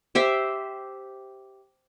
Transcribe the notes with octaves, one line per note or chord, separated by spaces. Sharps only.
G4 C5 E5